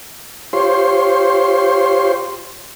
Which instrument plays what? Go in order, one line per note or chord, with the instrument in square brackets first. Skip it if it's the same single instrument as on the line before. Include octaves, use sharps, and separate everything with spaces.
[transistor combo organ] F4 G4 C5 C#5 C6